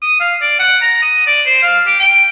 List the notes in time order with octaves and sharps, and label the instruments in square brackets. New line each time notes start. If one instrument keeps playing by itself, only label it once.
[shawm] D#6
F5
D5
F#5
A#5
D#6
D5
C5
F5
G4
G5